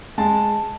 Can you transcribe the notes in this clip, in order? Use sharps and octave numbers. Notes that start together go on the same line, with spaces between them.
G#3 A5